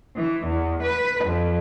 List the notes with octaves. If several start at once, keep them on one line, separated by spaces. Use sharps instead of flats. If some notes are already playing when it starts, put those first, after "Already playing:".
E3
E2
B4
F2